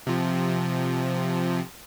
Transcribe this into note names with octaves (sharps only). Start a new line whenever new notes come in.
C3 F3